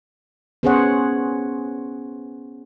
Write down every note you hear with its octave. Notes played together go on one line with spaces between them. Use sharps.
B3 C#4 G#4 C5 C#5 F#5